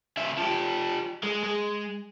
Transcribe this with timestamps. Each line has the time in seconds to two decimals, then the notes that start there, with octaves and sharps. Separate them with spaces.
0.17 C#3 E5
0.37 F3 G4
1.23 G#3
1.43 G#3